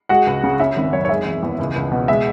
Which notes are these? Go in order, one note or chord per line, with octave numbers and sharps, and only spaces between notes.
G#3 F#4 F#5
C#2
C#3
C#4 E5
G#1
F#2 C#5
C#5
G#3 E5
E1
E2
C#2
C#2
B2
G#3 E5